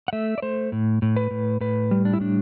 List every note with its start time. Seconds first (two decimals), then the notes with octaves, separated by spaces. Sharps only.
0.08 F#5
0.13 A3 E5
0.38 D5
0.42 A3 C5
0.72 A2
1.02 A2
1.16 B4
1.31 A2
1.61 A2 B4
1.91 G3
2.05 D4
2.14 E4
2.20 A2 D4